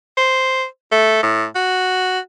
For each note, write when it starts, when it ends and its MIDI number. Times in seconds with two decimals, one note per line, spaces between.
0.17 0.65 72
0.92 1.19 57
1.23 1.46 45
1.55 2.19 66